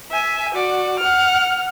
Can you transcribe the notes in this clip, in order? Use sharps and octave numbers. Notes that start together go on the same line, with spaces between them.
E5 G#5
F#4 D5
F#5 F6